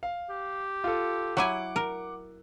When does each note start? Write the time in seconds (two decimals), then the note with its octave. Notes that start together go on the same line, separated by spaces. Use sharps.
0.03 F5
0.30 G4
0.84 F4 A4
1.37 F#3 E4 F#5 G#5 D6
1.76 A#4